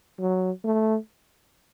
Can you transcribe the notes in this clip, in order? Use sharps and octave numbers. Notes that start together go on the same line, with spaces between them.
F#3
A3